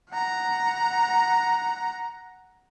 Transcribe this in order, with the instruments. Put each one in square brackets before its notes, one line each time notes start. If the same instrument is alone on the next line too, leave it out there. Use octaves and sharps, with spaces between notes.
[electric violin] F#5 A#5